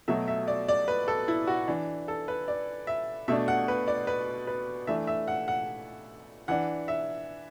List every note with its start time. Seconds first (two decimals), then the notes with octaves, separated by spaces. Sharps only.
0.08 B2 F#3 A3 E5
0.28 E5
0.48 D5
0.68 D5
0.88 B4
1.08 A4
1.28 E4
1.47 F#4
1.68 E3 D4
2.08 A4
2.28 B4
2.48 D5
2.87 E5
3.28 B2 A3 D4 E5
3.48 F#5
3.68 B4
3.88 D5
4.07 B4
4.47 B4
4.87 E3 A3 D4 E5
5.07 E5
5.28 F#5
5.48 F#5
6.48 E3 D4 F#5
6.88 E5